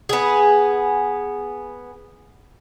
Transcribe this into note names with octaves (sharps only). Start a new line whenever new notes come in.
B3 G#4